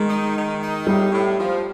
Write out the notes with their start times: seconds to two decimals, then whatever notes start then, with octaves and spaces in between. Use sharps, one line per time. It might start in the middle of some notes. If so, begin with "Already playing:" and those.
Already playing: D#3 G#3
0.09 D#4
0.35 D#3
0.61 D#4
0.87 A2 G3
1.12 A2
1.38 F3